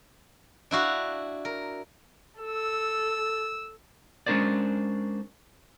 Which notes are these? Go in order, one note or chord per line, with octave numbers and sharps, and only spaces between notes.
D4 E4 F#4 F5
A#4
A4 E6
G#3 C#4 D4 A#4 C5 D5